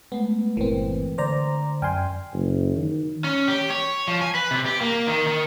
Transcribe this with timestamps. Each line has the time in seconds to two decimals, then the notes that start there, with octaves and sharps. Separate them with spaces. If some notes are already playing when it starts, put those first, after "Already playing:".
0.12 G#3 A3 B3
0.57 G1 A#2 E3 C4 A#4 B4
1.18 D3 C5 D5 A#5
1.82 F#2 D5 G5 G#5 C6 F6
2.33 F#1
2.76 D#3
3.24 C#4
3.48 G4
3.70 C#5
4.08 F3
4.21 G#5
4.35 B4
4.51 C3
4.65 G4
4.81 A#3
5.08 D#3
5.27 D#3